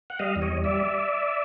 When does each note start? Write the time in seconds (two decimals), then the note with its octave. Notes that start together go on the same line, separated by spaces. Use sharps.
0.10 F#5
0.19 G3 D#5 F5
0.36 E2
0.42 C#5 D#5
0.53 G3
0.64 D5 E5